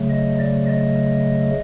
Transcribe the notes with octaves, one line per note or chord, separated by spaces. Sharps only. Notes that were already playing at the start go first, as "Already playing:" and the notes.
Already playing: C#3 F#3 A3
D#5
D5
D#5